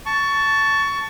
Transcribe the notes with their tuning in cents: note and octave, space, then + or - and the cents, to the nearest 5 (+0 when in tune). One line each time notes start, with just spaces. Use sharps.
A5 +0 C#6 +15